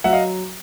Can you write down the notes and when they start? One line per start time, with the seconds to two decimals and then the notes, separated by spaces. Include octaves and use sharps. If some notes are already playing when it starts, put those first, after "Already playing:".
0.04 F#3 E5 F#5
0.13 D#5 F5